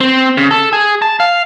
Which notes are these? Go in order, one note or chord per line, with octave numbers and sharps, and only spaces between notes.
C4
C#3
A4
G#4
A5
F5